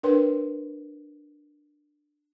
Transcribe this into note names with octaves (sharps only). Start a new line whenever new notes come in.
D4 A#4 B4 C#5 G5 C6